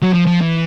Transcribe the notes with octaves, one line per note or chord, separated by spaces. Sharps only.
F#3
F3
F3
E3